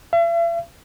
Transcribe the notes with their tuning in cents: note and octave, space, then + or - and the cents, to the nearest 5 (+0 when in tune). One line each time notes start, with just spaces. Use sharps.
E5 +45